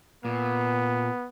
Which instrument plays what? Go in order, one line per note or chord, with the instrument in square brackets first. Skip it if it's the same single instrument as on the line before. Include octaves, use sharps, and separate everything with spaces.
[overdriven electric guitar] A#2 [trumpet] B3